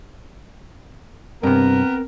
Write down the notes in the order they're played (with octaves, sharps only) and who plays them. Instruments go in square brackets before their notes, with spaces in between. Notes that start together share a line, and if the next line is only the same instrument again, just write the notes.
[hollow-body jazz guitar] G2 C3 [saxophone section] B3 A#4 [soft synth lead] C4